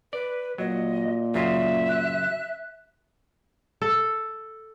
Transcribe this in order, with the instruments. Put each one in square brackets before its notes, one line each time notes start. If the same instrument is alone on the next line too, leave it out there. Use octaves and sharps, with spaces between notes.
[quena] B4 [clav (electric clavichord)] D5
[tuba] A#2 [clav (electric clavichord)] F#3 [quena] D#5
[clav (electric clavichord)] F#2 C#3 F4 [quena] E5
[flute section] F#6
[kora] A4